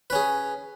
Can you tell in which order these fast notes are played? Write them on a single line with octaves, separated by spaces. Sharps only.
B4 C#4 G#4